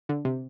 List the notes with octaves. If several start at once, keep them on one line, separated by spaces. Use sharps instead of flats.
D3
C3